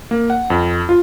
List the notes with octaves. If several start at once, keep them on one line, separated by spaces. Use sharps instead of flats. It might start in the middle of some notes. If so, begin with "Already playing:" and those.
A#3
F#5
F2
F4